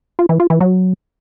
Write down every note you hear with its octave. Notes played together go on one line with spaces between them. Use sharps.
F4
E3
F4
E3
F#3